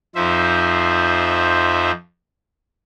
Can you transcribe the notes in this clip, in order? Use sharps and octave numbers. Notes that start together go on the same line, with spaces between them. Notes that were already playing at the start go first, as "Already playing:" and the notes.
F2 F3 D#4 C5 E5